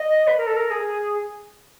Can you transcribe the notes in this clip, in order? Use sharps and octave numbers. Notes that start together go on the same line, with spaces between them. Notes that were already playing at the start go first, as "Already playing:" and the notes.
Already playing: D#5
B4
A#4
A4
A#4
G#4